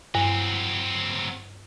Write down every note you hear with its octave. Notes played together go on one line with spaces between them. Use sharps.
G2 F#3 C4